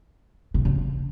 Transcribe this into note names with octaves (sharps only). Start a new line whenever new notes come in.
C3
C#3